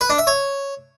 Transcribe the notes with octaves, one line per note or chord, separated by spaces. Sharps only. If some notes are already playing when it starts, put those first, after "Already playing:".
B4
D4
E5
C#5